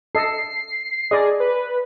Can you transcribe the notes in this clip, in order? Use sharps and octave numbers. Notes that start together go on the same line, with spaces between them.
A4 D#5 C7
G#4 D5 D#5
B4